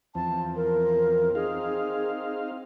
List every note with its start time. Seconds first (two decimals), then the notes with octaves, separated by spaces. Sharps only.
0.15 E2 F3 C4 A5
0.56 A#4
1.35 C4 D#4 G#4 F5